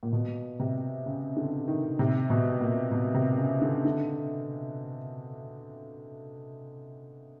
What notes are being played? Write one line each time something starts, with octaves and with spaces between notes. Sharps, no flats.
A#2
B2
C3
C#3
D3
D#3
C3
B2
A#2
B2
C3
C#3
D3
D3